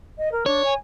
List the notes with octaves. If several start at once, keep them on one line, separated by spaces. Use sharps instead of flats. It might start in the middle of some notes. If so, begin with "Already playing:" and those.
D#5
A#4
D4 C#5
G#5